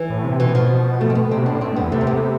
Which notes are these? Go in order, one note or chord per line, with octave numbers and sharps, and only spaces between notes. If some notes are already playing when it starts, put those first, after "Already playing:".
Already playing: E3
A2
C3
B2 E3
F3
A3
C4
B3
C3 C4
B2
A2 D4
A2 C4
G2
B3
E2
C3 A3
C4
B3